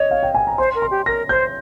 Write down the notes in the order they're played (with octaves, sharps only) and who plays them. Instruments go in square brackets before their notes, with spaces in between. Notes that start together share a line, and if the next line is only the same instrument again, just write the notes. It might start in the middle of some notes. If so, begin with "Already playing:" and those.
Already playing: [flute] C#5 [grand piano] D#5
[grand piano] F5
G5
G#5
A#5
[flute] C5 [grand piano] C6
[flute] A#4
[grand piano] C6
[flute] G4
[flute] A#4 [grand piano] A#6
[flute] C5 [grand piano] G6